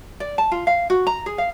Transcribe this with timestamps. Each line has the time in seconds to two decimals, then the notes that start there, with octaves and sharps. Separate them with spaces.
0.20 D5
0.38 A5
0.52 F4
0.67 F5
0.90 F#4
1.07 A#5
1.26 G#4
1.38 F5